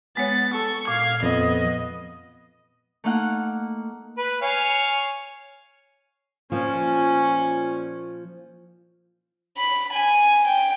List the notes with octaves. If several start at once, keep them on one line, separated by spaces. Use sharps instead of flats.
G#3 B3 C#5 A6
A4 C#6
A#2 F5 G#6
F2 B3 D#5
A3 A#3 D#4 F5 F#5
B4
C#5 F5 G#5
A#2 F3 C#4
B5
G#5
G5